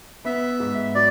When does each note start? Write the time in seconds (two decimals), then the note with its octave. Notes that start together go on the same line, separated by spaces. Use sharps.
0.25 B3 E5
0.60 G#2
0.95 F#3 D5